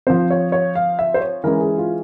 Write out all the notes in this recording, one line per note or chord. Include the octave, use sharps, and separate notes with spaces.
F3 C4 C5
C#5
C#5
F5
E5
C5
C#5
E3 G#3 C#4 A#4
G#4
F4